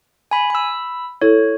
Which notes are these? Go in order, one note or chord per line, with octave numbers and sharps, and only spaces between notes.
G#5 B5
B5 E6
E4 A4 C#5